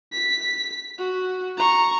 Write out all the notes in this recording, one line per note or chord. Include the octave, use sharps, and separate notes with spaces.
B6
F#4
A#5 C#6